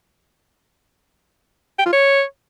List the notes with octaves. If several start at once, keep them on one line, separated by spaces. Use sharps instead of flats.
G5
F4
C#5